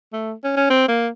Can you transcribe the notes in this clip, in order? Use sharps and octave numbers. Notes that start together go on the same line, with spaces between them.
A3
C#4
C#4
C4
A#3